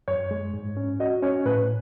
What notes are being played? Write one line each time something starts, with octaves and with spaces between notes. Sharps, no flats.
F#2 C#5
G#3
G#2
C#4
F#4 D#5
C#4 C#5
A2 B4